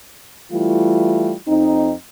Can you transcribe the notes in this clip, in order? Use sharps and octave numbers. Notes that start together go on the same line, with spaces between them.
E3 G3 A3 E4 F4
F2 C4 D#4